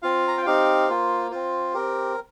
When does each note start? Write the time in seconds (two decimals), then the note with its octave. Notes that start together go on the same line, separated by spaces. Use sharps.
0.02 C4 F4 F5
0.28 A#5
0.38 G5
0.46 C4 D#4 G4 F5
0.88 A#3 F4 C5
1.31 C4 F4 C5
1.74 C4 G4 A#4